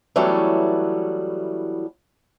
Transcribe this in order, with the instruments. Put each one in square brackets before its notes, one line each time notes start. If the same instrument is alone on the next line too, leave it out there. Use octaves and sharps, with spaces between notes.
[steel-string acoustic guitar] E3 F#3 G3 A3 B3 C#4